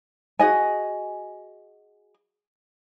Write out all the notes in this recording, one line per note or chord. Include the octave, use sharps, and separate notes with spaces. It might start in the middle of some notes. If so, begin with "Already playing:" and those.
F#4 G#4 D#5 G#5